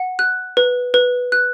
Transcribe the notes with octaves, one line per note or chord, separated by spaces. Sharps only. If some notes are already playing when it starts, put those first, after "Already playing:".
Already playing: F#5
F#6
B4
B4
F#6